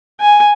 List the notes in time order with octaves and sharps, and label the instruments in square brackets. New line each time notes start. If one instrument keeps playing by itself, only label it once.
[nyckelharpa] G#5